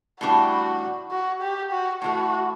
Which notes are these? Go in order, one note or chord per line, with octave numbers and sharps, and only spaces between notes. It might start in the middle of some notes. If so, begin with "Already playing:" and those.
A2 E3 G3 D4 F#4
F#4
G4
F#4
A2 E3 A3 F#4